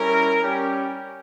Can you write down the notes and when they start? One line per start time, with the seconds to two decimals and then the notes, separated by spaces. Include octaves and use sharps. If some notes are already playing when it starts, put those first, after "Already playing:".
Already playing: G3 C#4 E4 A#4
0.43 G3 C#4 G4